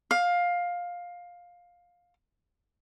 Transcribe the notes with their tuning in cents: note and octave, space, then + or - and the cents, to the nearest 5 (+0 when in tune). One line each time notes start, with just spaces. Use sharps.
F5 +15